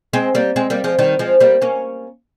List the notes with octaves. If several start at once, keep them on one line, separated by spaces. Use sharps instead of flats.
G#3 C4
G3 A#3
G#3 C4
G3 A#3
F3 G#3
D#3 G3
F3 G#3
G3 A#3
A#3 C#4